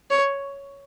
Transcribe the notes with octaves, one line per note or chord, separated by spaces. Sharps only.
C#5